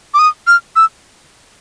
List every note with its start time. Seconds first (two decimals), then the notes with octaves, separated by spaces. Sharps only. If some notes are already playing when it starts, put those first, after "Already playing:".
0.14 D6
0.19 D#6
0.47 F6
0.76 E6